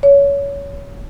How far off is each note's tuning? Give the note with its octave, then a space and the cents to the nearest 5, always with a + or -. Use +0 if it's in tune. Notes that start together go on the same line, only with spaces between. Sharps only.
C#5 +25